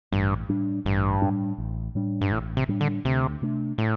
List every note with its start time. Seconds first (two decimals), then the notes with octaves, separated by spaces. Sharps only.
0.12 A1 G2
0.49 A2 G3 D4
0.85 A1 G2
1.22 A2 G3 D4
1.58 A1
1.95 A2 G3 D4
2.21 G2
2.32 A1 A2
2.57 C3
2.69 A2 G3 D4
2.81 D3
3.05 D2 C3
3.42 C3 A3 D4
3.78 A2